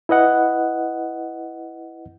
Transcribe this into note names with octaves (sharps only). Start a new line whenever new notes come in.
E4 B4 D#5 F#5